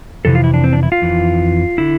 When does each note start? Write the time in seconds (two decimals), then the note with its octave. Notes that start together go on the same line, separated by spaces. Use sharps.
0.25 F2 C3 E3 A4
0.35 F4
0.44 E4
0.54 D4
0.64 C4
0.73 D4
0.83 E4
0.92 F4
1.02 F2 E3
1.78 D3 E4